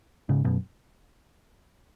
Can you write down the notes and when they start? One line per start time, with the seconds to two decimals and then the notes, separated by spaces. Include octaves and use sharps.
0.29 G#2 C#3
0.45 F#2 B2